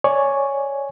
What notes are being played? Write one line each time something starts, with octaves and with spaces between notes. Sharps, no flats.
C#5 D5 G#5 C#6